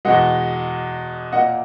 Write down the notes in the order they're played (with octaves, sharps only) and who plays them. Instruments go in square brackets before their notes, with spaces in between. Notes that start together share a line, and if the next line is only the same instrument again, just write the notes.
[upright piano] E2 B2 G#3 D#5 F#5
A#2 A#3 D#5 F#5